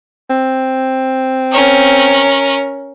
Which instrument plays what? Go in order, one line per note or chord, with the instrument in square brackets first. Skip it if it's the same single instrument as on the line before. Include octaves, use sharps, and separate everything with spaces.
[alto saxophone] C4
[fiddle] C#4 A#4